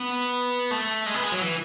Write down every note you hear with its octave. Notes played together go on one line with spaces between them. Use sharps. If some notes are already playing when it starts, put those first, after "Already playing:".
Already playing: B3
A3
G#3
B3
G#3
F#3
E3